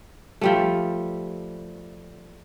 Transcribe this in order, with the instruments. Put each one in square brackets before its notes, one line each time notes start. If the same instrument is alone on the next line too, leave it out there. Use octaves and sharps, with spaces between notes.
[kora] F3 G3 A3